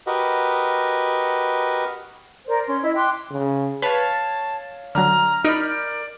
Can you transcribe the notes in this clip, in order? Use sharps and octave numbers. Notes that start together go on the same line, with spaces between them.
F#4 G4 A#4 B4 D#5
A#4 C5 D5
C#4 C6
E4 D#5
G5 C6 D6 F#6
C#3
B4 C#5 F5 A5
D3 F#3 A#5 F6
D#4 A#4 D5 B5 G6